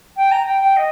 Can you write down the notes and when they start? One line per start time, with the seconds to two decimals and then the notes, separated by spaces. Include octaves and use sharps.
0.16 G5
0.31 A#5
0.46 G5
0.61 G5
0.76 D#5